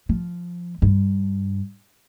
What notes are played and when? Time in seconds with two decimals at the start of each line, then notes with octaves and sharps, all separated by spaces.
0.09 F3
0.82 G2